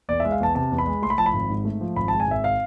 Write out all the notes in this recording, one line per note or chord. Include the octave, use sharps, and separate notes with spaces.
E2 D5
G#3 E5
F5
E2 A5
C3 A5
E2
B5
G#3
A3 C6
B5
F3 A5
B5
G#1
G#2
A3
F3
G#1 B5
G#3 A5
G#5
G#1 E5
F5